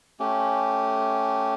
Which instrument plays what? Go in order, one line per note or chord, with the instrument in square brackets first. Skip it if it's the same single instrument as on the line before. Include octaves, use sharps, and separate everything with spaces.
[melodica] A3 C#4 G4